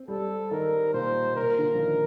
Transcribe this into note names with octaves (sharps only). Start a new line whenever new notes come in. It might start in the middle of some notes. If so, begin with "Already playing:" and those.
Already playing: C4
G3 A4
D#3 A#4
A#2 C5
A#2 A#4
D3
F3
D#3